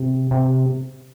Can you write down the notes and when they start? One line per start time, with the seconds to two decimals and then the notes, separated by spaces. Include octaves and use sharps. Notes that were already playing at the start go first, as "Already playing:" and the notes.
Already playing: C3
0.31 C3